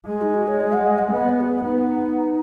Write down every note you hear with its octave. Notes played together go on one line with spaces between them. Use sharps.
G#3 G#4
D#4
F#4
C#5
D#5
F#5
D#5
F#5
B3 D#5
B4
F#4
G#4
B3 D#4